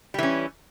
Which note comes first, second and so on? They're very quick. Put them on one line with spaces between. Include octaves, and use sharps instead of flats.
G3 E3 C#4